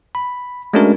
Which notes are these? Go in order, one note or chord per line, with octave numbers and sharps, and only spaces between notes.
B5
G#3 A3 C#4 D4 F#4 A#4